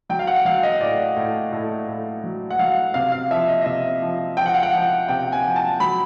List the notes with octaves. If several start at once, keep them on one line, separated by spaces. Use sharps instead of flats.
F#3 G5
F5
F#5
F#3 F5
D#5
A2 D5
A2
A2
A2
F#3
F#5
F#3 F5
C3 F5
F5
F3 E5
D#5
D#5
C3 E5
F3
F3 G5
F#5
F5
F#5
F3
C3 G5
G#5
F3
A5
F#3 B5